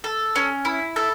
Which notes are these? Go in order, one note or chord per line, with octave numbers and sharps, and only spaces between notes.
A4
C#4
E4
A4